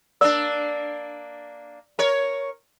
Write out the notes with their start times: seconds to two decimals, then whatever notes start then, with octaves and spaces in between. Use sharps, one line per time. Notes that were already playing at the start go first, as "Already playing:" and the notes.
0.21 A#3 D4 D5 E6
1.99 A#4 C#5